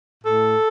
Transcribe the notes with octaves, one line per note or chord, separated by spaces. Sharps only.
A2 A4